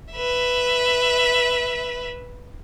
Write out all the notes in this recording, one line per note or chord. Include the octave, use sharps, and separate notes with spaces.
B4 E5